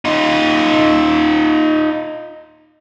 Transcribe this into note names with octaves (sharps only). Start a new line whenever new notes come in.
D#4 F4